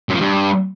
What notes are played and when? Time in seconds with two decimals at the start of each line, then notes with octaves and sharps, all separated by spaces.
0.09 F#2
0.14 F3
0.20 G2